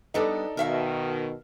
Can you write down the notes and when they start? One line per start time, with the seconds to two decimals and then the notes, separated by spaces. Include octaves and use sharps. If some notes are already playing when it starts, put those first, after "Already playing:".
0.14 G3 B3 D4 D#4 A4 D5
0.57 B2 D#3 A#4 E5 F5